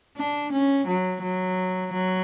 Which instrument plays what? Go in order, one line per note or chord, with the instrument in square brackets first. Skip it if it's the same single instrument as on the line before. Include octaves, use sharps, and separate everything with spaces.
[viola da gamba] D4
C#4
F#3
F#3
F#3